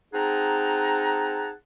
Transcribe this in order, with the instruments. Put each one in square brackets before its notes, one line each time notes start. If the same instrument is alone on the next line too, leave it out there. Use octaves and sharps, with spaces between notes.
[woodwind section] C4 D#4 G#4 F#5 A5 A#5